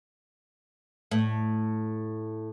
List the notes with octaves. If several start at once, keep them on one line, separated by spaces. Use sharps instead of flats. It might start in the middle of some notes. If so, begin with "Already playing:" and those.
A2